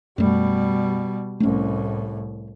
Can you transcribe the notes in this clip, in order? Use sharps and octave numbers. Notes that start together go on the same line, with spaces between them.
F#2 B2 G3 A3
C2 A2 A3 C4 C#4